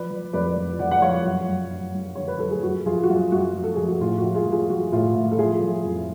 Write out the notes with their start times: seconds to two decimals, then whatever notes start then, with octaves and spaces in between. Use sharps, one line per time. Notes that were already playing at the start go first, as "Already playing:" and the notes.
Already playing: F3 B4 D5
0.10 F3
0.33 F2 B4 D5
0.56 F3
0.79 F3 D5 F#5
0.91 F#5
1.02 F3 C#5 F5
1.26 F#2
1.48 F#2
1.71 F#2
1.95 F#2
2.15 D3 C#5
2.28 B4
2.39 F#3 A4
2.51 G#4
2.63 F#2 F#4
2.86 F3 F4 G#4
3.03 F#4
3.09 F#2 F4
3.32 F#2 F#4
3.55 F3
3.64 A4
3.76 F3 G#4
3.88 F#4
4.01 A2 F4
4.18 F#4
4.24 F3
4.35 F4 G#4
4.47 F3
4.52 F4 G#4
4.70 F3 F#4
4.92 A2 F4
5.15 A2
5.32 A4
5.39 F3 F4 G#4
5.62 F3
5.85 F2